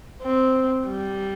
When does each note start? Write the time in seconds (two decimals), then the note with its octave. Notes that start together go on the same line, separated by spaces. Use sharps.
0.23 C4
0.88 G3